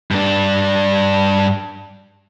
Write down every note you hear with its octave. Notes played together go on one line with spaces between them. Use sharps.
G2 D4